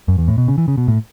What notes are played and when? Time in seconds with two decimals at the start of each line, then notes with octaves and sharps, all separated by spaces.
0.08 F#2
0.18 E2
0.28 A2
0.38 B2
0.48 C#3
0.58 E3
0.68 C#3
0.77 B2
0.88 A2